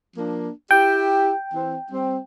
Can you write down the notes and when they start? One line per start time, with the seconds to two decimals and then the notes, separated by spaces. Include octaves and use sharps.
0.17 F3 A#3 D4
0.71 E4 G4 G5
1.54 E3 C4
1.91 G3 C4